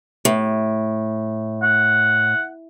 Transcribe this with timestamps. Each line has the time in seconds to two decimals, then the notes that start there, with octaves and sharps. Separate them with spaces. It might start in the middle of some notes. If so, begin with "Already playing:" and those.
0.25 A2
1.63 F#5